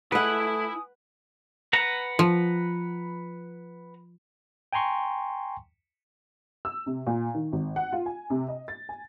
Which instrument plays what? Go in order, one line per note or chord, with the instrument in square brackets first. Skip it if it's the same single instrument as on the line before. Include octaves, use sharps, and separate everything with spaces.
[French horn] A3 [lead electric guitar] E4 B5 [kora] B4 F#5 [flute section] G#5 D#6
[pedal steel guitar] B4 F#5 A#5
[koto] F3
[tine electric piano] G5 G#5 A#5 C6 C#6
[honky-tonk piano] E6
C3
A#2
D#3
G#1
F#5
F4
G#5
C3
D#5
A6
G#5